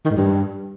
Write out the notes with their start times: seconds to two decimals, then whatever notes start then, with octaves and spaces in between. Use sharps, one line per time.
0.05 D#3
0.11 G#2
0.16 G2